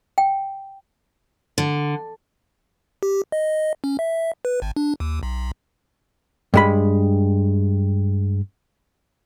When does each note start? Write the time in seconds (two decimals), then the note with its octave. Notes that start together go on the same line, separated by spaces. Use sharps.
0.18 G5
1.58 D3
3.03 G4
3.32 D#5
3.84 C#4
3.99 E5
4.45 B4
4.62 G#1
4.76 D4
5.00 D#2
5.23 B1
6.54 G2 G#3 B5